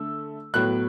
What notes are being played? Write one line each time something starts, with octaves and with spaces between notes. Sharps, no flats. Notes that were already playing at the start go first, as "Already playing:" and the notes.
Already playing: D3 A3 E6
A2 F#3 B3 F#6